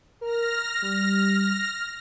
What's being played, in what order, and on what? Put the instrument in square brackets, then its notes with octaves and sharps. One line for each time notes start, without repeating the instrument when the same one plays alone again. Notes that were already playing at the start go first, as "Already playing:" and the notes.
[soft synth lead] A#4 [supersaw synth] F6 A#6
[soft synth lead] G3